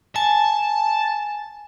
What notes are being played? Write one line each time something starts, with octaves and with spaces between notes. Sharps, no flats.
G#5 A5